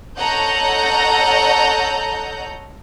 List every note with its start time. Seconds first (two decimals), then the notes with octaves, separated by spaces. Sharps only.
0.18 A4 C#5 D#5 F#5 A#5 G6